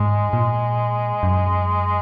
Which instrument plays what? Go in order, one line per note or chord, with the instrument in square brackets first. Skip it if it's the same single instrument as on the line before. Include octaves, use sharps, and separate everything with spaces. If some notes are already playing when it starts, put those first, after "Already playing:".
Already playing: [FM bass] G#2 [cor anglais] G#3
[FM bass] A#2
F#2